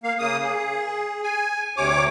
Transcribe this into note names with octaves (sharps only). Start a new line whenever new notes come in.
A#3 F5
C#3 A#3 D#6
G#4
G#5
D2 C3 C#5 D6